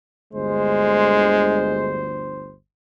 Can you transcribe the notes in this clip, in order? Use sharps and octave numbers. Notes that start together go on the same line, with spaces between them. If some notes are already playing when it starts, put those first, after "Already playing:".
G1 D2 G#3 C5